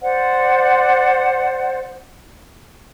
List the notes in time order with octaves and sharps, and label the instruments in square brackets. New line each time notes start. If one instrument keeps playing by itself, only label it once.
[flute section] C5 D5 F#5